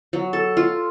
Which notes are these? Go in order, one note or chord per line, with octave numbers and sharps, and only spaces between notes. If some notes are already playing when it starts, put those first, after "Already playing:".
F#3
A4
F4